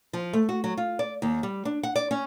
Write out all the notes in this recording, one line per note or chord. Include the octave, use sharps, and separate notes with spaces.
F3
A3
F#4
F#3
F4
D5
D#2
G3
D4
F#5
D5
C#4